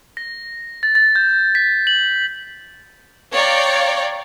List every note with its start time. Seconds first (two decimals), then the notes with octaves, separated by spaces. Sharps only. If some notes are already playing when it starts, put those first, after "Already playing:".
0.17 A#6
0.83 A6
0.95 A6
1.16 G6
1.55 B6
1.87 F#7
3.34 C#5 D5 F5 G5 A#5